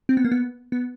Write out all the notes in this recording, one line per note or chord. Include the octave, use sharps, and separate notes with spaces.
C4
B3
A#3
B3
B3